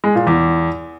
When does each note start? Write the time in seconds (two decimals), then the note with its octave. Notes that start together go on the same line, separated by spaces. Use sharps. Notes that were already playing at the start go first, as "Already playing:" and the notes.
0.04 G#3
0.15 A#2
0.27 E2